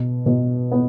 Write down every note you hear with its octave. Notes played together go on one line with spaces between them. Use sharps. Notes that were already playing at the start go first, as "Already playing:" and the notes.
Already playing: B2
B2
B3